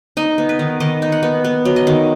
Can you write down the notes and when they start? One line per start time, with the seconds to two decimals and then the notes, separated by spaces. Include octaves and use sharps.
0.17 D#4 D#5
0.38 B3
0.49 B4
0.59 D#3
0.80 D#3 D#5
1.02 D#4
1.12 F#5
1.23 B3
1.44 B3
1.65 F#3
1.76 D#5
1.87 D#3